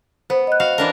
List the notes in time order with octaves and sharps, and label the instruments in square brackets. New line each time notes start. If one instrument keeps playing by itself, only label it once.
[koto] B3 [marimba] C5
[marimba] D#5 F#6
[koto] F#4 F5
E3 D4 A#4